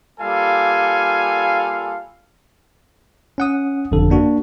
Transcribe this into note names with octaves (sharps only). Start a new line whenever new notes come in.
G3 A#3 F4 A4 F5 G#5
C#4 F#5 D#6
G1 F2 D3 A4
A#3 D4 F#4